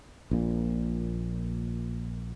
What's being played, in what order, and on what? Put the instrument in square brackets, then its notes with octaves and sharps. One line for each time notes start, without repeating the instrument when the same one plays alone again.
[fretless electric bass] A#1 A#2